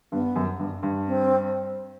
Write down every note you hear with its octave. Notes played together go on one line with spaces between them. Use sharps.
G2 B3
F#2
G2
G2
C4